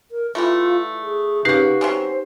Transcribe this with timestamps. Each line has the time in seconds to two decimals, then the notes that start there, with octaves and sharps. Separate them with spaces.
0.11 A#4
0.35 E3 G3 A3 F4
1.02 G#4
1.45 C#3 A#3 D#4 F#4 G4 B4 C7
1.81 F#3 C4 C#4 C5